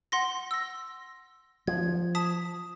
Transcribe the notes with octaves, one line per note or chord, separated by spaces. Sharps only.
F#5 C6 A#6
E6 A#6
F3 G#6
A5 D#6 B6